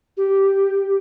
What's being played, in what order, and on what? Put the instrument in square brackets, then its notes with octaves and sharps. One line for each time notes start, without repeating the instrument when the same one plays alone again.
[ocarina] G4